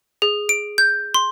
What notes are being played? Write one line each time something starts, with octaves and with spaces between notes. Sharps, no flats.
G#4
D7
G6
C6